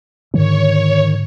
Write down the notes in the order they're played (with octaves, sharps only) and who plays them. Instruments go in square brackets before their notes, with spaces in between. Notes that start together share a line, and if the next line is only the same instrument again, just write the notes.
[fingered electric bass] G#2 D3 [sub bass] D#3 [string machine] C#5